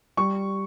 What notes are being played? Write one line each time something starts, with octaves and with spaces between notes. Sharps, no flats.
G3 C#6